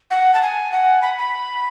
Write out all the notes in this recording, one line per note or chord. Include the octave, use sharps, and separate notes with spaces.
F#5
A5
G#5
F#5
B5
B5